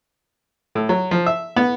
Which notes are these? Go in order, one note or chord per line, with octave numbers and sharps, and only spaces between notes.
A2
F#3
F3
E5
B3